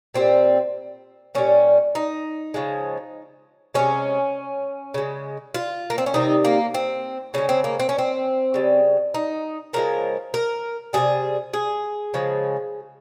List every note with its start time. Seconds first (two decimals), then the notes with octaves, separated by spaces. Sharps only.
0.14 A#2 G3 C4
1.35 A#2 G3 C#4
1.95 D#4
2.54 C#3 F3 G#3
3.74 C3 D#3 G#3 C#4
4.94 C#3 G#3
5.54 F4
5.90 A#3
5.98 C4
6.06 C#4
6.14 C3 D#3 G3 D#4
6.45 A#3
6.74 C4
7.34 C#3 G#3 C#4
7.49 C4
7.64 A#3
7.80 C4
7.89 C#4
7.98 C4
8.54 C#3 G3
9.14 D#4
9.73 C#3 F3 G#3 A#4
10.34 A#4
10.93 C3 D#3 G3 G#4
11.53 G#4
12.14 C#3 F3 G#3